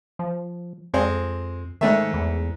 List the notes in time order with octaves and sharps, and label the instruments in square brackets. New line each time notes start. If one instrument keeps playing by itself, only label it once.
[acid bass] F3
[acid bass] F2 [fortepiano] G#3 C4
[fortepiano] G#2 A3 E5 [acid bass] D#3
[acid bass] E2